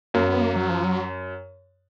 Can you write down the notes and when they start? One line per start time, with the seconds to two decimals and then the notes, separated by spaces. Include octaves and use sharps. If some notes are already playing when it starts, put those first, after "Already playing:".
0.14 F#2 A#3
0.27 B3
0.41 A#3
0.56 F#3
0.69 F3
0.84 F#3